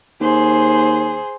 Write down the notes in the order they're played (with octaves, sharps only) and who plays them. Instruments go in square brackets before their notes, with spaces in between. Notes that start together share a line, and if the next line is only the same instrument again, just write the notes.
[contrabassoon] D#2 [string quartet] G#4 C5